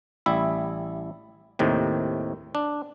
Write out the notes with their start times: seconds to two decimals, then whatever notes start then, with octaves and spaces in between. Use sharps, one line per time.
0.26 A1 G3 E4 E5
1.59 D#2 A2 C3 D#3
2.55 D4